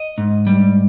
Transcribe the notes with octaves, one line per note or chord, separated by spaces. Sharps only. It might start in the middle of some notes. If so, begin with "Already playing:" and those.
Already playing: D#5
G#2
G3